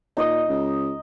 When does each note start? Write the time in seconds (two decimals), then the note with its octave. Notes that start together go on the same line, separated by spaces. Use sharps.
0.17 A#2 D#4 D#5 D#6
0.49 C#2